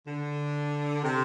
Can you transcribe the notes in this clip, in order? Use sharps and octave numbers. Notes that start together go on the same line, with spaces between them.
D3
C3